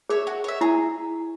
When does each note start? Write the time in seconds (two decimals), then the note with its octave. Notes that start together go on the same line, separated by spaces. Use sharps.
0.10 G#4 C#5 E5
0.27 F#4
0.44 C#5 E5
0.61 E4 G#4